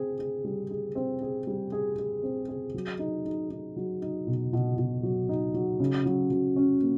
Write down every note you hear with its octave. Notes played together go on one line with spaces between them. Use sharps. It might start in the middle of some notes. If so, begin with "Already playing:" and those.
Already playing: C4 G#4
G#4
G3
G#4
C4
G#4
G3
G#4
G#4
C4
G#4
F#3
D#4
D#4
D#4
F#3
D#4
B2
B2
B2
F#3
D#4
F#3
C#3
F#3
F#3
C#4
A#3